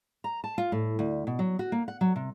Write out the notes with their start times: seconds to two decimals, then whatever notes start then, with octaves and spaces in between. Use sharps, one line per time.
0.24 A#5
0.44 A5
0.58 F4
0.72 A2
0.99 D2
1.27 B2
1.39 F#3
1.59 F#4
1.72 A#3
1.88 F#5
2.01 F#3
2.16 C3